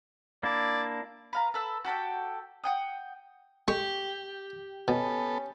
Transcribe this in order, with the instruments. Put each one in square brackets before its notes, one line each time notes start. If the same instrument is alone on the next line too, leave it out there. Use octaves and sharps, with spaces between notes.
[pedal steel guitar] A#3 D4 E4 [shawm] D5
[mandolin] B4 F5 A#5
A4 B4 E6
F#4 G4 A4 G5
F#5 G5 D#6
[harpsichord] G#3 C#6 [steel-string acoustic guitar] G4
[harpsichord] B2 [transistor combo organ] B3 A4 [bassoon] C#4